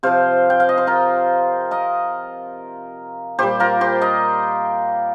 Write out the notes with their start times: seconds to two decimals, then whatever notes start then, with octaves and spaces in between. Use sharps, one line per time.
0.03 C3 F3 C5 F5
0.50 G5
0.60 F5
0.69 D#5
0.78 C5
0.87 F4 A#4
1.71 A#4 D#5
3.39 A#2 G3 G4 C5
3.60 F4 A#4
3.81 G4 C5
4.01 A#4 D#5